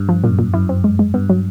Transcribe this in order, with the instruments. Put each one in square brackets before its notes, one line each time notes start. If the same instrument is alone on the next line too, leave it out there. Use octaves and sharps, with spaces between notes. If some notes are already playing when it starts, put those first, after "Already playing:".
Already playing: [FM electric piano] G2
[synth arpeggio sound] F3
[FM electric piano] F#2 [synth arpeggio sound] A#2
[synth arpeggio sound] A#2
[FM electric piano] F#2 [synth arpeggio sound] E4
[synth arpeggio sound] C4
G#3
G#3
[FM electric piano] G2 [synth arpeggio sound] B3
[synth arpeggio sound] F#3